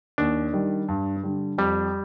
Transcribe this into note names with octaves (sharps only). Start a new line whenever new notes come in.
D#2 D4
D#3 G3
G2
D3 G3
F2 G3